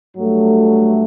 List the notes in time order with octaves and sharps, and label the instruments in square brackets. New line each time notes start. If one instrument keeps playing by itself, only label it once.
[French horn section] G2 F#3 A3